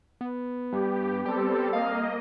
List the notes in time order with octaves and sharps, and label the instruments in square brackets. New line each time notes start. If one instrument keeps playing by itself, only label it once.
[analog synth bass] B3
[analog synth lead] G2 [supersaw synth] G4
[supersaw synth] G3 C4 A4 [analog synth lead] G4
[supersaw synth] A#3 D#5 [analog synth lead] F5